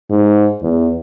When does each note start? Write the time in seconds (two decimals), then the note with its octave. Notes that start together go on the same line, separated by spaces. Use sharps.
0.10 G#2
0.62 E2